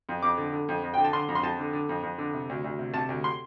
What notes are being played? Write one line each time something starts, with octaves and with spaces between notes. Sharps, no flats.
F2
F2 D6
D3
D3
F2
F2
D3 G5
A5
D3 C6
F2
C6
F2 A5
D3
D3
F2
F2
D3
C3
D2
D2
C3
C3 A5
D2
C6